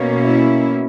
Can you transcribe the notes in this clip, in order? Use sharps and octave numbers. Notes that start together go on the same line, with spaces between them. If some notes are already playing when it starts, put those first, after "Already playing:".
Already playing: B2 A#3 C#4
E4